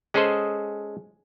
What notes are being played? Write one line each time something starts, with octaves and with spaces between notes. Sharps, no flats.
G#3 C#4 G#4 A4 C5 D#5